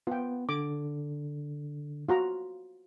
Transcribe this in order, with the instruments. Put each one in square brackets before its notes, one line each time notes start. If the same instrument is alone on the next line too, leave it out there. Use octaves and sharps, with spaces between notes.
[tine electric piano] B3 [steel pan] F4 G5
[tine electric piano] D3 [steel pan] D6
[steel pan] F4 F#4 A#5